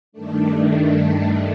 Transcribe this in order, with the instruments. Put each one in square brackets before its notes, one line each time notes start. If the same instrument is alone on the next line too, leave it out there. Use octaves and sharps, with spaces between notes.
[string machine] G2 D#3 A3 D4